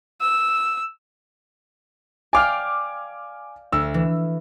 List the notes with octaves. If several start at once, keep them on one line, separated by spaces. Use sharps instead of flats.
E6
D5 F5 G5 G#5 D6 F6
D2 E6
E3